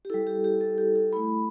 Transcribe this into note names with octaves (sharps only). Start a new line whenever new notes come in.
G4
G3 E4 A4
G4
G4
A4
G4
A4
A3 E4 B5